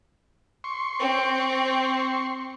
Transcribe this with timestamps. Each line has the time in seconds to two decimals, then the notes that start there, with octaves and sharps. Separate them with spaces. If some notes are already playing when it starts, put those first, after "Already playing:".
0.64 C6 C#6
0.99 C4